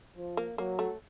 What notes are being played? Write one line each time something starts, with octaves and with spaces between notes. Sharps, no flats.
F3
A#3
F#3 A#3
A3